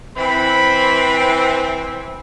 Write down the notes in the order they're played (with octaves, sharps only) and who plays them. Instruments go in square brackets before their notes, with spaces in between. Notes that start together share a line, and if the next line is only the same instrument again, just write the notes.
[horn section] E3 C4 [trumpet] B5